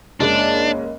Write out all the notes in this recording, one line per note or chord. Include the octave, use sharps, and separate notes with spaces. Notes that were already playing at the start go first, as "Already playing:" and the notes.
F#1 G#3 A#3 D4 C#5 D#5